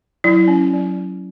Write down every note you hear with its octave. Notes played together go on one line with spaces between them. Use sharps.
F#3 E4
C#4
F#3